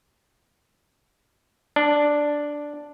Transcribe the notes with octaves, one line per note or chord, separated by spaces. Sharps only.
D4